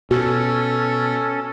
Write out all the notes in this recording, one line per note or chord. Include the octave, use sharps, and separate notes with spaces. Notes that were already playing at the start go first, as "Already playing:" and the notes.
B2 C#4 F#4 A4